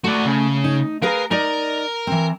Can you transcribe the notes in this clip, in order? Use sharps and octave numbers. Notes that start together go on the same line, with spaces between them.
A3 F#4 D5
C#3
D#4
G#4 A#4 B4 F5 A#5
D#4 A#4 D5 D#5
E3 C4